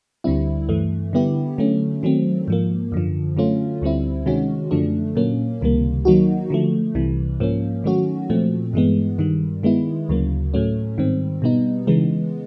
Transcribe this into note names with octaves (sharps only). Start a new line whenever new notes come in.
D2 D3 G3 C4 E4
G2 E3 A3
D3 G3 B3 E4 G4
D3 F#3 A3 C#4
D#3 F#3 A3 C4
G#2 F3 A#3
F#2 D3 F3
D3 F#3 A3 C#4 F4
D2 D3 G3 C4 E4
C3 D#3 G#3 C#4 F#4
F#2 D3 F3 A3 D4
A#2 F#3 A#3 C#4
C#2 C3 D#3 G3 A#3
D#3 F#3 A#3 D#4 F#4
D3 F3 A3
C2 C3 E3 G3
G#2 F3 A#3 C#4
D#3 F#3 A3 C#4 F#4
A#2 F3 A3 C4
G2 E3 G#3 B3
G2 D#3 G3
D#3 G#3 B3 E4
D2 C#3 F#3 A#3
A2 F#3 A3 C#4
G#2 D#3 G3 C4
B2 G3 B3 D#4
C#3 E3 G#3 B3